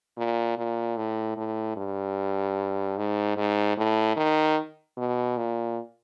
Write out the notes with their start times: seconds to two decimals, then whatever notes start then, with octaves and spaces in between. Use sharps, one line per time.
0.17 A#2
0.58 A#2
0.97 A2
1.37 A2
1.76 G2
2.97 G#2
3.37 G#2
3.77 A2
4.16 D#3
4.97 B2
5.37 A#2